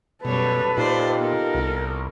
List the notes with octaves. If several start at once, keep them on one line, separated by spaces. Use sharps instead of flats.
F#2 B2 G3 A4 B4 C#5
A#2 D#4 F4 G4 C5 D5
B3 A4 A#4
C2